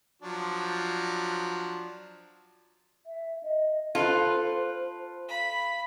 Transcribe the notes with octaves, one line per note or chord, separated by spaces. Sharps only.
F3 F#3 D4
E5
D#5
F4 A4 B4 C5
F5 B5